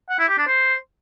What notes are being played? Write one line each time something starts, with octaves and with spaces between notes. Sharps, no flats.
F#5
E4
G4
D4
C5